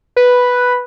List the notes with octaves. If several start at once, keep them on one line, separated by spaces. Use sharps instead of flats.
B4